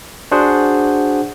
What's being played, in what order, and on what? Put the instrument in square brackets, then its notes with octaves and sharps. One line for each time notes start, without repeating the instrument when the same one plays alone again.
[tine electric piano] D4 F#4 G#4 C5 F#5